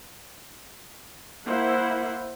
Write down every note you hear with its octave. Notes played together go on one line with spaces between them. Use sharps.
A#3 E4 C5 F#5